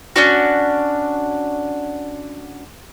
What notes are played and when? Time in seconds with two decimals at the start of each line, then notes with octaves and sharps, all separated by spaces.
0.16 C#4 D4 F#4